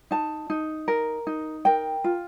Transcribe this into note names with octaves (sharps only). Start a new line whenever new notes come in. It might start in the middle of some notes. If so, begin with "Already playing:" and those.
D#4 A5
D#4
A#4
D#4
A#4 G5
F4